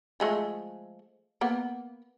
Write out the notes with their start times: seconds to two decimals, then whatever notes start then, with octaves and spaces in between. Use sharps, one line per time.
0.20 F3 G#3 A3
1.41 A#3 B3